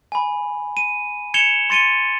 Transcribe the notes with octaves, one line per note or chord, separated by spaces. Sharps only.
G#5 B5
D#7
G#6 C#7 E7 F7 G7
C6 A6 C#7 D#7 G7